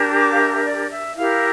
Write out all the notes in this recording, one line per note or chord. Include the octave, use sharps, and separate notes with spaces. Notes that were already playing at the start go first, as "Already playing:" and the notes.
Already playing: D4 G4 A#4
D6
F5
E5
E5
D5
E5
E4 G4 A#4 F5